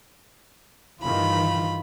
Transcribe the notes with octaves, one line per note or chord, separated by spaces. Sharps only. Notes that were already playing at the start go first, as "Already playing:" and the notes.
G2 D#3 E3 F4 B5